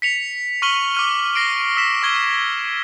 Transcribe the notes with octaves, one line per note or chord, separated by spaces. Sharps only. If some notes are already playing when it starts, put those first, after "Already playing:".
B6 C#7 F7
C#6 F6 B6 D#7 F#7 G7
D6 F6 D#7
A#6 C7 D7
E6 B6 E7
C#6 G#6 G7